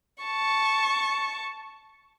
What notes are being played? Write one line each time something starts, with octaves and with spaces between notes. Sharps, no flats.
A5 C#6